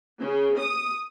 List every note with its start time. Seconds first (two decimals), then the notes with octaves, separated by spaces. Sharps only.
0.20 C#3
0.58 D#6